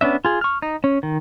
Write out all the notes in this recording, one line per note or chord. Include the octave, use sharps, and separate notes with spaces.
B3 C#4 D4 E5
F4 G#4
C#6 F6
D#4
C#4
D#3